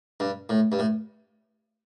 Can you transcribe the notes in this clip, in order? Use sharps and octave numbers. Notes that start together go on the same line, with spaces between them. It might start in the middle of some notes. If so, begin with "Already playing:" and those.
G2
A2
G2
A2